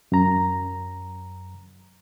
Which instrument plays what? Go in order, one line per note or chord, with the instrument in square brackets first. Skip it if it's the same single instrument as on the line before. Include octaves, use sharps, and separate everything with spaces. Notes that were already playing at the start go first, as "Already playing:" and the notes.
[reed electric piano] F#2 A#5